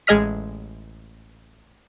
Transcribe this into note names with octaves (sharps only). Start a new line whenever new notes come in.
A1 G#3 G#4 D#5 F6 B6